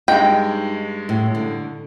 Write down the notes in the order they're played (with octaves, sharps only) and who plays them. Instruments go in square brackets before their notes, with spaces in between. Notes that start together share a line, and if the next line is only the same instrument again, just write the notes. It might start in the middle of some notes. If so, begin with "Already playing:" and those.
[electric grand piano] G2 G#3 [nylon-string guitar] D#4 D#5 [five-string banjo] G5
[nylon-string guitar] A2
D3